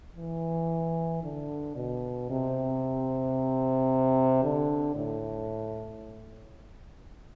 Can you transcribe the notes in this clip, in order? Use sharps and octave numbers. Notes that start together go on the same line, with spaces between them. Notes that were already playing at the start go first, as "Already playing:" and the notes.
E3
D3
B2
C3
D3
A2